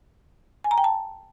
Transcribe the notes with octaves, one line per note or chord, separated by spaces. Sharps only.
G#5
A#5
G5
A5